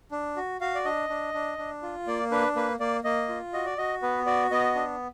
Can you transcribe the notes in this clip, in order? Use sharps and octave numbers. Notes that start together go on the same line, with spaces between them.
D4
F#4
F#4 F5
D5
D4 D#5
D4
D4
D4
F4
A#3 D5
D4 B4
A#3 B4
A#3 D5
A#3 D#5
F4
F#4 D#5
D5
F#4 D#5
B3 B4
F#4 D5
B3 D#5
D4